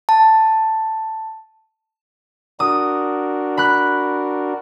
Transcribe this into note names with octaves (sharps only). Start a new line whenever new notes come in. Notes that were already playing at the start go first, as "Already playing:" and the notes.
A5
D4 F#4 A#4 D#6
B5 F#6